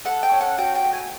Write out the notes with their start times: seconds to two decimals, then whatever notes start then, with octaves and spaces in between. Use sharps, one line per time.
0.05 A4 F#5
0.23 G5
0.32 C#4
0.41 F#5
0.58 F#4 G5
0.75 G5
0.84 A3
0.93 G#5